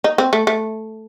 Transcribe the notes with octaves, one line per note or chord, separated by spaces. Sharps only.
D#4
C4
A3
A3